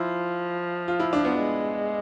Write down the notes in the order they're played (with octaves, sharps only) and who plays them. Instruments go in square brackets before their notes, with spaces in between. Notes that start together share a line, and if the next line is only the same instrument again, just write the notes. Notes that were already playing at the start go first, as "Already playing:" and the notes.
Already playing: [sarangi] F3 [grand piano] E4
[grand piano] F4
E4
D4
B3
[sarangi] G#3